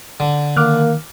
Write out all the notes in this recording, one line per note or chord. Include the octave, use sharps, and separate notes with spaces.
D3
D#3 A#3 D6 F6 F#6